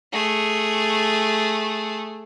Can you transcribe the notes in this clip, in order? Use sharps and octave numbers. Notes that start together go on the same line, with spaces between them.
A3 G#4